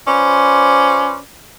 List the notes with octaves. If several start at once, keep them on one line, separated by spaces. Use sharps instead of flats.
C#4 F4 B4 C5 D5